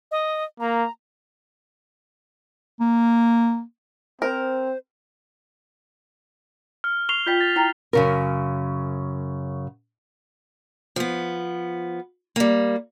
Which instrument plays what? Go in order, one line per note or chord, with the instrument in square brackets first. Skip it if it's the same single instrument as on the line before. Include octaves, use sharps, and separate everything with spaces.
[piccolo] D#5
[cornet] A#3 [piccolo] A#5
[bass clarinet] A#3
[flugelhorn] C4 [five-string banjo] A#4 [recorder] C5
[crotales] F6
[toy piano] C#6 [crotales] C7 F7 G7
[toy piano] F4 D#5 G5 [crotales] G6 B6
[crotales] A6
[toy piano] E4 G5 A#5
[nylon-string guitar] F#2 C#3 A#4
[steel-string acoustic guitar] F3 B3
G3 A#3